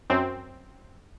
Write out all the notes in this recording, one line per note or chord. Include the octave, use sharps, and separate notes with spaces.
F#2 C4